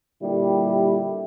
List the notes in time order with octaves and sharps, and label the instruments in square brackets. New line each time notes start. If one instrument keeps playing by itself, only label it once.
[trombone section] A#2 D3 G3 E4 G4